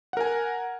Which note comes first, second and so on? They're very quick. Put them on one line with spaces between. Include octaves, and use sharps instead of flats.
F#5 A#4 G#5